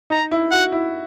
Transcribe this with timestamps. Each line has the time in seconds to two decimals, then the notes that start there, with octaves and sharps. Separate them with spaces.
0.10 D#4 A#5
0.31 E4
0.52 F#4 F#5
0.72 E4